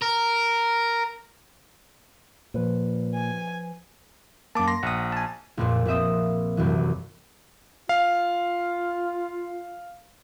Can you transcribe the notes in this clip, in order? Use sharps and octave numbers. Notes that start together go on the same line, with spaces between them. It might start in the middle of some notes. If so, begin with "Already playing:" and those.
A#4
A#2 F3 B4 C5
G#5
F#2 A#3 A5 D6
C6 A#6
A#1 F#5 D#6
G#5 A5
A#1 F2 A#2
A#2 C4 E5 D#6
C2 F#2 E3
F4 F5